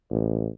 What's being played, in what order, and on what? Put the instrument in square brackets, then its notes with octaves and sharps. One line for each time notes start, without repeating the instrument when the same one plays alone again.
[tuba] A1